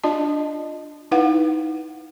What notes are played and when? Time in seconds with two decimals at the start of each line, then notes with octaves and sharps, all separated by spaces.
0.04 D4 F4 D5 D#5 A5
1.11 D#4 E4 B4 F5 F#5